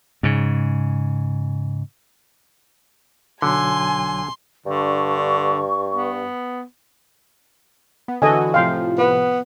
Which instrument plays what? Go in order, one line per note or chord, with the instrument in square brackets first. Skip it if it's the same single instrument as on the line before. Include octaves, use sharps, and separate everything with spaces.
[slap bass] G#2 C#3
[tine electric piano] B1 F#3 [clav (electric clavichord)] D3 [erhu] G#5 [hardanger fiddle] C6
[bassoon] G2 [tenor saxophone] D3 [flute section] C#6
[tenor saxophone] B3
[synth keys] B3
[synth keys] D3 E3 F#4 [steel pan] A4 D#5 G#5
[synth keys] A2 C3 F3 [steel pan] F5 G5 C6
[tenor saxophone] B3 [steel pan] B4